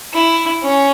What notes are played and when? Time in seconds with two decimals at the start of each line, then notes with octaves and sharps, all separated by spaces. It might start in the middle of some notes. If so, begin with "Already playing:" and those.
0.13 E4
0.63 C#4